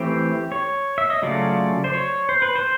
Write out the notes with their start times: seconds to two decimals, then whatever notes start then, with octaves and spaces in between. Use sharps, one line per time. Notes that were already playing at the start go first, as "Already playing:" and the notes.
Already playing: E3 A3 C4 G4
0.52 C#5
0.98 E5
1.10 D#5
1.22 C#3 F#3 A3 C#4 F4 D5
1.84 C5
1.94 C#5
2.29 C5
2.42 B4
2.56 C5